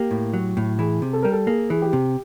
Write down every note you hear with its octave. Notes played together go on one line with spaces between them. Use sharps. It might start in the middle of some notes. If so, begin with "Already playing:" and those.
Already playing: A#3 G4
A2
F#3
A2
E3 G#4
C3
A4
G3 A#4
A4
A#3 G#4
E3 G#4
G4
C3